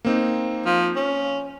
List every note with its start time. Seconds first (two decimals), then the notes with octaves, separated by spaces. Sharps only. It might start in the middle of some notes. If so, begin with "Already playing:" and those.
0.05 A#3 C4 D#4
0.66 F3
0.96 C#4